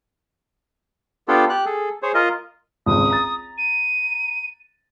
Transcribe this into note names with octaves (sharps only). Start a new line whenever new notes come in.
B3 D4 F4 G4 A4
G4 F#6
G#4 A4
G#4 C5 C#5
F4 A#4 D#5
G#1 C#2 D#6
A#5 A6
D#7